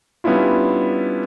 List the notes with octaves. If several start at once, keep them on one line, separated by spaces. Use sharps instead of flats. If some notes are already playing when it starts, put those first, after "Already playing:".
G3 B3 C#4 D4 E4 F4